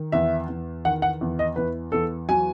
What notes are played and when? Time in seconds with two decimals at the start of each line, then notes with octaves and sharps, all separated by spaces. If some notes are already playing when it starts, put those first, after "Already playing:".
Already playing: D#3
0.12 E2 E5
0.49 E2
0.85 D#3 F#5
1.02 F#5
1.21 E2
1.39 D#5
1.56 E2 B4
1.92 E2 A4
2.29 F#3 G#5